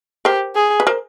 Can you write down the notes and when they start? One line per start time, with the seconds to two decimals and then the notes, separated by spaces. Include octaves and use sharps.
0.25 G4 A#4 C5
0.55 G#4
0.80 B4
0.87 A#4 C5